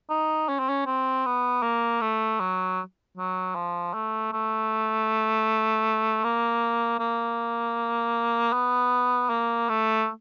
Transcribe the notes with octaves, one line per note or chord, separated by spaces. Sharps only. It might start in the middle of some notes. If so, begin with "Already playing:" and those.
D#4
C#4
C4
C#4
C4
B3
A#3
A3
F#3
F#3
F3
A3
A3
A#3
A#3
B3
A#3
A3